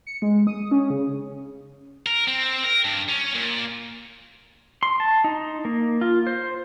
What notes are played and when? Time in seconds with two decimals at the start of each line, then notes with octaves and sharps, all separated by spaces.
0.07 C#7
0.22 G#3
0.47 D#6
0.71 C#4
0.90 C#3
2.06 A#4
2.28 C4
2.64 A#4
2.84 G2
3.08 C#4
3.35 A#2
4.83 C6
5.00 A5
5.24 D#4
5.65 A#3
6.01 F4
6.27 C5